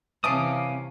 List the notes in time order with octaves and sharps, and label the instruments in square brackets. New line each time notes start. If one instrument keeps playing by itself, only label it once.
[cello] C3 E3 [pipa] C#4 E5 A5 [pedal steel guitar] F5 D6 D#6